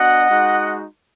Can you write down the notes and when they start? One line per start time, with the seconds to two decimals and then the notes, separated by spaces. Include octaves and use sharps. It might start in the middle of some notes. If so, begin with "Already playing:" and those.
Already playing: B3 D4 F#4 D#5 F#5
0.28 G#3 D#4 F#4